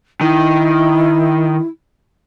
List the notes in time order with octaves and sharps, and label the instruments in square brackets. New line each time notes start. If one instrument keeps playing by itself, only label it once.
[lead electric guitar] D#3 [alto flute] E4